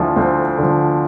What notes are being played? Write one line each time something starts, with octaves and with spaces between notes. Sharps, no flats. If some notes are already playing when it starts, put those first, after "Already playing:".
Already playing: D2 D3 F3 E4
D2 C4
D3 F3